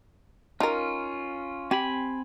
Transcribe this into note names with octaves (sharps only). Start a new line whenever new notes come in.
C#4 D#4 F4 A#4
C4 G4 G#5 B5